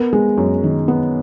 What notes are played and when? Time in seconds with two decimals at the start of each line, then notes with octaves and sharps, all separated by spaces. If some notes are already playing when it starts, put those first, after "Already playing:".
Already playing: B3 A#4
0.13 G#3
0.38 F#2
0.64 D#3
0.88 B3